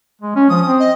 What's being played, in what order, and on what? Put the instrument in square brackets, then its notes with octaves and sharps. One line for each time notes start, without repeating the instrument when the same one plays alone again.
[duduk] G#3
C#4
[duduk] F3 [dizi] D#6
[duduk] C4
[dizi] D#5